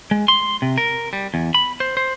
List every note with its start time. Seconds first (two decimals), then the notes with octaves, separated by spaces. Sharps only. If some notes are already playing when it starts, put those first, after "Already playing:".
0.11 G#3
0.28 C6
0.62 C3
0.78 A#4
1.13 G3
1.34 E2
1.55 B5
1.80 C5
1.97 C5